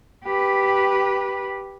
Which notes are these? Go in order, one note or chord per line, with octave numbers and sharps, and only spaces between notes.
G4 B4